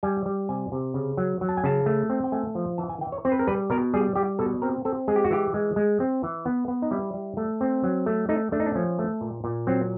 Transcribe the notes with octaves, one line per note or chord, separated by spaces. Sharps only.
G3 G#5
G3
C3 G#5
C3
C#3
F#3
F#3
A5
G#5
C#3 A5
A3
C4
G5
A3 G#5
F3
E3 A5
G#5
E3 G5
C#5
C4 C5
B4
A#4
G3 B4
B2 A#4
G3 G#4
G3 G4
B2 A4
C4 A#4
C4 A4
G#3 G#4
G4
F#4
E3 G4
G#3
G#3
C4
E3
B3
B3
D#4
G3 E4
G3
A3
C4
F#3
A3
A3 D#4
A3 D4
D#4
D4
F3 C#4
A3
A#2
A#2
F#3 C4